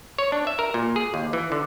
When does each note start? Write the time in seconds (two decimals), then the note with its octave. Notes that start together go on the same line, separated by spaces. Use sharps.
0.18 C#5
0.32 D4
0.47 E5
0.59 A#4
0.74 A#2
0.96 G#4
1.14 D#2
1.33 E3
1.52 D3